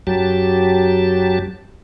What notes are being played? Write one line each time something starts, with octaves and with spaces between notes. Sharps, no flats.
F#2 F#3 G4 A5